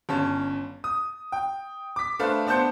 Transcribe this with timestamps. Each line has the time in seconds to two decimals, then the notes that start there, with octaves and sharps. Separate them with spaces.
0.09 G1 C#4 A5
0.84 D#6
1.32 G5
1.96 D6 B6
2.19 A3 D4 B4 C5 F5 A5
2.47 B3 D4 C5 A5 G6 C#7